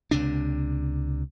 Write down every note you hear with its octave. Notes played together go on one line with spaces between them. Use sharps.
C#2 C3 D4